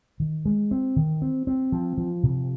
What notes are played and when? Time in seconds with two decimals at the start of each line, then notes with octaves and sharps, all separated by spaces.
0.20 D#3
0.46 G#3
0.71 C4
0.96 D#3
1.22 C4
1.47 C4
1.72 F3
1.98 F3
2.23 C3